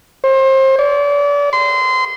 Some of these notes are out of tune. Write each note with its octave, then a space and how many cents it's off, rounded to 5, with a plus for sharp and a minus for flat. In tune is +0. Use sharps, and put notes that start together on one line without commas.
C5 +30
D5 -35
C6 -25